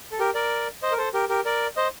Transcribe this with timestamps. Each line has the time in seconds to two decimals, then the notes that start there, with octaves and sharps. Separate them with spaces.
0.12 A4
0.19 G4 A#4
0.35 A#4 D5
0.82 C5 D#5
0.92 A#4
0.98 A4 C5
1.14 G4 A#4
1.29 G4 A#4
1.45 A#4 D5
1.76 C5 D#5